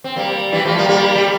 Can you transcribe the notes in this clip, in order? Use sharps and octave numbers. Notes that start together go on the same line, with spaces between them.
C4
G3 A#3
E3 G3
F3 A3
G3 A#3
G3 A#3
G3